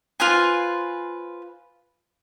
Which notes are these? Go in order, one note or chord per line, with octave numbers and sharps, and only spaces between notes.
F4 B4 C5 G#5